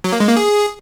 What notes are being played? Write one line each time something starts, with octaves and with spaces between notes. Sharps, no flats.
F#3
A#3
G#3
A#3
G#4